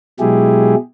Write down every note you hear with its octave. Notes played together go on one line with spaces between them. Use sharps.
B2 F#3 G#3 E4 G4 G#4